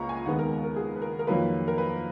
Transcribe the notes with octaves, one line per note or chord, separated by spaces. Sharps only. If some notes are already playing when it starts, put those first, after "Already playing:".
Already playing: C#2 C#3 A#3 A#5 C#6
G#5
D#2 D#3 G#3 B3 F#5
A#4
A#4
G#4
B4
A#4
A#4
F2 D#3 F#3 A#3 B4
A#4
B4